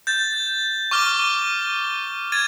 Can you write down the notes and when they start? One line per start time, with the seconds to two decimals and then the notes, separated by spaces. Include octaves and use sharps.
0.07 G6 A6
0.91 C#6 D6 F6 G7
2.32 G#6 A6 D#7